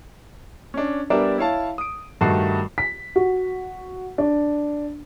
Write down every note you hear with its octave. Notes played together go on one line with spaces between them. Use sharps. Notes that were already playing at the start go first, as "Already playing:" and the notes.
C#4 D4
G3 B3 D4 A#4 D5 E5
E4 C#5 F5 A5
D#6 D7
G2 D#3 A3 F#4 C7
B6
F#4
D4